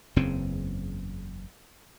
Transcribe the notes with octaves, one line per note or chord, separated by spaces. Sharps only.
F#1 E2 C#3 C4